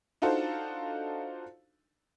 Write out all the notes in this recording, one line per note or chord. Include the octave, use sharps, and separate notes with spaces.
D4 D#4 F4 F#4 A4 C5